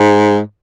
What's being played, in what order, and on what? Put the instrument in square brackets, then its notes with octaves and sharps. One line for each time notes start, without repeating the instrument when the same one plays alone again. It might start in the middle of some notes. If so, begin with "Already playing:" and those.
Already playing: [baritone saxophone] G#2